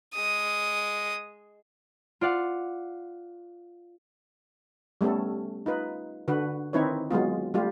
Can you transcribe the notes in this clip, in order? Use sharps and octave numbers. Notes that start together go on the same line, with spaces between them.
G#3 D#6
F4 D5 F5 F#5
G3 A3 B3 C#4 A4
D#4 F4 B4
D3 F#4 B4
D#3 C4 D#4 E4 B4 C#5
F#3 G#3 B3 F4
G3 A3 F4 G4